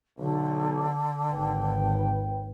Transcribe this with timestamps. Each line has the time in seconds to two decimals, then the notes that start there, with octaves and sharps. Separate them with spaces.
0.19 B1 D3
1.32 G#1 D#2 B4 G5